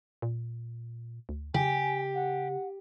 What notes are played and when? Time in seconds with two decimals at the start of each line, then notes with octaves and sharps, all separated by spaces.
0.22 A#2
1.29 D2
1.54 C#3 G4 G#5
2.15 F#5